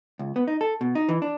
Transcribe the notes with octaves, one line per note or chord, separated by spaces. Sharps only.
C#2
B3
D#4
A4
B2
D#4
E3
D4